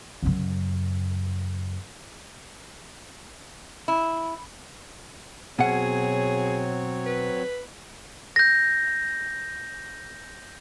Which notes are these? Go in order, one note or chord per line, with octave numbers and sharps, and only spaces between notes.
F#2 C#3
E4
B2 F#3 C4 G#4 C#5 F#5
B4
G6 A#6